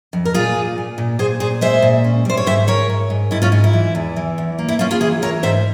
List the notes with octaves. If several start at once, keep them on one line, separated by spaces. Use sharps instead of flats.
F2
A#4
A#2 F4 G#4
A#2
A#2
A#2
A#2 G#4 C5
A#2 G#4 C5
G#3 C5 E5
A#2
C#4
G3 C5
C#5
G#2 C5 E5
G#2 A#4 C#5
G#2
G#2
G#2 E4
C#4 F4
G#2
E4
E3
E2
E3
E2
A#3
E4
A#3 C#4 F4
F4 G#4
E3 G#4 C5
E3 A#4 C#5
G#2 C5 E5